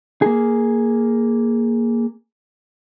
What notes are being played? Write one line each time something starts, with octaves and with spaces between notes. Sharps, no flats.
A#3 G#4